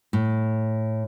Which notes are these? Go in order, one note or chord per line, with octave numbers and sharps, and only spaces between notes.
A2